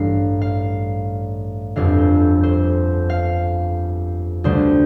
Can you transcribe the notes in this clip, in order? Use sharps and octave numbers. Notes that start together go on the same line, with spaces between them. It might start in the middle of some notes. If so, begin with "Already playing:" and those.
Already playing: A1 G2 G3 F5
F5
G1 F2 D3 F5
C5
C5
F5
D2 D3 G3 C5